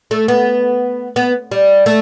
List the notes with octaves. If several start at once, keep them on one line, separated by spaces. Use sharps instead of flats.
A3
B3
B3
G3
A3